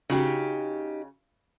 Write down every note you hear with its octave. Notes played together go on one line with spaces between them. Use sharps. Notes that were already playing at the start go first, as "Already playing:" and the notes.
C#3 D#4 F#4 G4